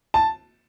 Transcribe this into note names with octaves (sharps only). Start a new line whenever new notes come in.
A5